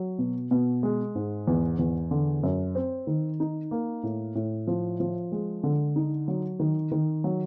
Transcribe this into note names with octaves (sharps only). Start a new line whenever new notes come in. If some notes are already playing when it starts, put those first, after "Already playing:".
Already playing: F#3
B2
B2
G#3
G#2
E2
E2
D3
F#2
C4
D#3
D#4
A#3
A2
A2
F3
F3
G#3
D3
D#4
F#3
D#3
D#3
F#3